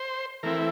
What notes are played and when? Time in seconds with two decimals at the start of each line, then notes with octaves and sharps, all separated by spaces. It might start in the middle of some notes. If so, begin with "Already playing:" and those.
Already playing: C5
0.43 E3 A3 C4 E4 A#4